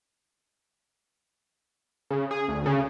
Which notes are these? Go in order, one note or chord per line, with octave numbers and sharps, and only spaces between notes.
C#3
G#4
D2
C#3